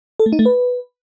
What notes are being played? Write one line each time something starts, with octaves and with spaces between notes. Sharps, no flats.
A4
A3
D#4
A3
B4